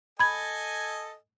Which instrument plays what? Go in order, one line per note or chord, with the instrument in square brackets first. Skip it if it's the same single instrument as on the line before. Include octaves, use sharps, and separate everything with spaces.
[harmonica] A4 D#5 G#5 [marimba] B5 G#6